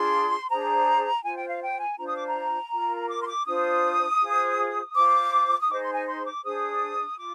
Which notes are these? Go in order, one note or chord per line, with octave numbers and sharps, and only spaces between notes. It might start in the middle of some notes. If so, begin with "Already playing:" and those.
Already playing: D4 F4 G#4 C6
D4 G#4 C5 A#5
F4 C5 G#5
G5
F5
G5
G#5
D4 F4 C5 A#5
D#6
D6
A#5
F4 A#4
D6
C6
D6
D4 F4 C5 D#6
F4 G#4 C5
F4 C5 D6
D#6
D#4 G#4 C5 D6
C6
G#5
C6
D6
D4 G#4 C5 D#6
F4 D6